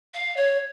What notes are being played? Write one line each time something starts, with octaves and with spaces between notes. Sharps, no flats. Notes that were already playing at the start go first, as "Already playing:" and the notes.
F5
C#5